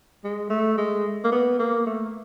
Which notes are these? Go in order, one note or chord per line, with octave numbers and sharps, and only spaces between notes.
G#3
A3
G#3
A#3
B3
A#3
A3